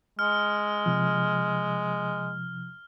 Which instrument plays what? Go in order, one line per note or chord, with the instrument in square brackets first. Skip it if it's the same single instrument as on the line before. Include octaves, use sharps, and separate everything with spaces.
[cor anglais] G#3 [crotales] F6
[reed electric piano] C3 F3